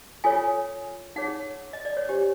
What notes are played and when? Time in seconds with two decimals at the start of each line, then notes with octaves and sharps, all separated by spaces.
0.24 F4 A4 C#5 G#5
1.16 D#4 G#4 C#5 F#5
1.73 D#5
1.85 D5
1.97 C#5
2.09 D4 G4 C5